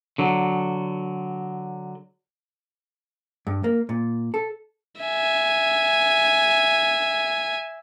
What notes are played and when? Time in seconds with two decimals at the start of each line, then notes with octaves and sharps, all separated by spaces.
0.18 D3 F#3
3.47 G2
3.64 A#3
3.89 A#2
4.34 A4
5.02 E5 G#5